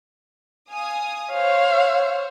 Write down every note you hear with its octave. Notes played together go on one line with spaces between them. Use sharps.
F5 G#5 D#6
C5 C#5 F5